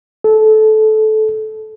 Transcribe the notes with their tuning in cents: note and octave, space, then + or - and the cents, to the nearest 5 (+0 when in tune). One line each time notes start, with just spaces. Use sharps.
A4 -20